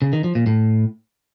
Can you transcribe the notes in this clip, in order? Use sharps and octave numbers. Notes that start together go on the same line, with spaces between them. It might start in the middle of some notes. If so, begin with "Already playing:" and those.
C#3
D#3
F3
A#2
A2